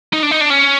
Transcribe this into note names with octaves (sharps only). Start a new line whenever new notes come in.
D#4
D4
D#4
D4
C#4